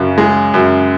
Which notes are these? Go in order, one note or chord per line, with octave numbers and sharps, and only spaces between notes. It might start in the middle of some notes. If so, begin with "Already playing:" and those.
Already playing: F#2 C#3
G#3
F#2